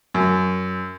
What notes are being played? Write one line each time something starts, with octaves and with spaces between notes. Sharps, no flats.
F#2